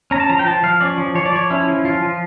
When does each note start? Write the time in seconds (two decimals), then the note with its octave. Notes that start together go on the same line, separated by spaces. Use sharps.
0.11 C#4 A#5
0.20 A5
0.29 F3 A#5
0.39 G5
0.46 F3 A5
0.63 F3 F5
0.81 C#4 D5
0.98 F3
1.15 F3 C#5
1.26 D5
1.33 F3 C#5
1.50 C#4 E4
1.68 F3
1.85 F3 F4
2.02 F3